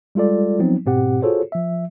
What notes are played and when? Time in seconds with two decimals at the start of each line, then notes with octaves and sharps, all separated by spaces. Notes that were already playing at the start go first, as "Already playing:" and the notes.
0.15 G3 G#3 F4 A4 D5
0.59 F3 F#3 B3 C4 D#4
0.86 G#2 B2 C4 G4 F#5
1.22 F4 F#4 G#4 A4 C5 C#5
1.52 F3 E5